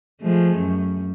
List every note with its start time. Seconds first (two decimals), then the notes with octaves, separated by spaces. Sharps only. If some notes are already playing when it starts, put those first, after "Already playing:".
0.21 F3 G#3 A3
0.57 F#2